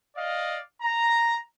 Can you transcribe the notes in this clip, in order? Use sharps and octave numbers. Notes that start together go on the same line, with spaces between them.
D5 D#5 F5
A#5